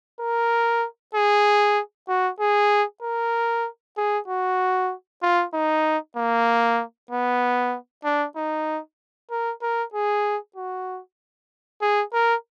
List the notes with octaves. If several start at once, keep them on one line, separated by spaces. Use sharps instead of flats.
A#4
G#4
F#4
G#4
A#4
G#4
F#4
F4
D#4
A#3
B3
D4
D#4
A#4
A#4
G#4
F#4
G#4
A#4